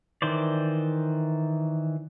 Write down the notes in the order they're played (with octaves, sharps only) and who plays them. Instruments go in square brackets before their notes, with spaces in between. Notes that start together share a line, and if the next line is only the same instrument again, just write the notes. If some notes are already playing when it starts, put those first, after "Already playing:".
[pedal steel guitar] D#3 E3 C5 D5